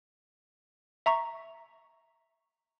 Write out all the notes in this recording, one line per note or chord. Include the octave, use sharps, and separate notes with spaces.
E5 A#5 C#6